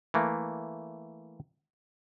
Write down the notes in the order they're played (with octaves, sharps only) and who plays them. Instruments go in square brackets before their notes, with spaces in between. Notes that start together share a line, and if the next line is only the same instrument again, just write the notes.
[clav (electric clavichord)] E3 A3 A#3